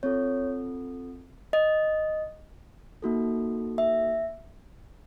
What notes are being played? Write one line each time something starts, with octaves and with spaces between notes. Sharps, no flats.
C4 F4 A4 C#5
D#5
A#3 D#4 F#4 A4
E5